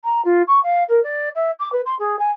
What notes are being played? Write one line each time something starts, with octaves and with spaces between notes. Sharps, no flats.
A#5
F4
C#6
F5
A#4
D5
E5
D6
B4
C6
G#4
G#5